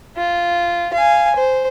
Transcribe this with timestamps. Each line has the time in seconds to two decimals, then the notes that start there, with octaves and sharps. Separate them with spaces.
0.17 F4
0.93 F5 G#5
1.35 C5